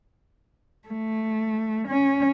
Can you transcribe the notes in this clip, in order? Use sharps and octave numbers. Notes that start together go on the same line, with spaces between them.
A3
C#4